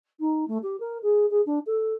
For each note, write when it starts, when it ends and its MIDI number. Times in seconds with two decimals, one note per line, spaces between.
0.20 0.44 63
0.47 0.58 57
0.63 0.79 67
0.80 0.98 70
1.02 1.26 68
1.30 1.41 68
1.46 1.59 62
1.66 1.94 69